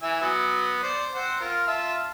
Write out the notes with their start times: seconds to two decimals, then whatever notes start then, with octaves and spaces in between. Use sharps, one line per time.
0.02 E3 E5 G#5
0.21 F#3 B3
0.83 C5 D5
1.15 C4 C5 F#5
1.40 F4 A#4
1.67 F4 E5 A5